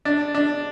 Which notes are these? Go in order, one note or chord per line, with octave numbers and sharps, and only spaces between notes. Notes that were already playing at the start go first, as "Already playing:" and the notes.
D4
D4